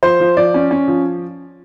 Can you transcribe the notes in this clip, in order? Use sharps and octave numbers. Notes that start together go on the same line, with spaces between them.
F3 C5
F3
F3 D5
C#4
C#4
F3